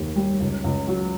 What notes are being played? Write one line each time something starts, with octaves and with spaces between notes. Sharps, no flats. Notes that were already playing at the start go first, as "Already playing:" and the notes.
Already playing: D#2 A#3
G3
C#2
C#2
F#3